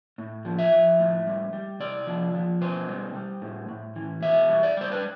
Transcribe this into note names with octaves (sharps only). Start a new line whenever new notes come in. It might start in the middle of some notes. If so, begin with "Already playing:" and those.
A2
F3
E5
F3
A2
G3
G3
C3 D5
F3
F3
B2 C5
G3
G3
A2
A2
E3
B2 E5
G3
D5
G3 C5
B4